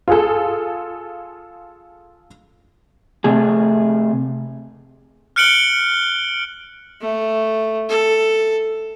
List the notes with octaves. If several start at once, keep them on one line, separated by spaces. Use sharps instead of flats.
F4 G#4 A4
C3 A3 G#4
F6 F#6 C#7 D7 F#7 G7
A3
A4